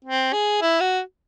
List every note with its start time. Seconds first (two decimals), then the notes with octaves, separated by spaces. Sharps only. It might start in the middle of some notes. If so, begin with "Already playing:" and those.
0.04 C4
0.33 G#4
0.62 E4
0.80 F#4